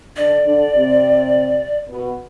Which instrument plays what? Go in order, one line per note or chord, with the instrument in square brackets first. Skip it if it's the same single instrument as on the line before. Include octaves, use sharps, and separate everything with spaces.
[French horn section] D3 D4 [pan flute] D5
[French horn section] D3 D4
C3 C4
B2 B3